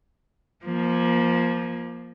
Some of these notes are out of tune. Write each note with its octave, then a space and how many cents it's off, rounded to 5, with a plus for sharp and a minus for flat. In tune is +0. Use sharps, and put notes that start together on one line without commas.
F3 +0 A#3 +25